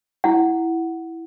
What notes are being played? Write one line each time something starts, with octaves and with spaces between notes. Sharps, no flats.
E4 F#5